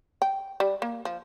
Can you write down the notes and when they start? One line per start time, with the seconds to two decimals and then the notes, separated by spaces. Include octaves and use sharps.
0.22 G5
0.60 G3
0.82 A#3
1.05 F3